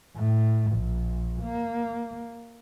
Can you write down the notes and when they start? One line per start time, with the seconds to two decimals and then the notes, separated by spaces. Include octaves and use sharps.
0.16 A2
0.72 A#1
1.42 A#3